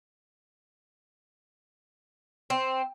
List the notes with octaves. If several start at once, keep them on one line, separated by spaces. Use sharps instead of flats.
C4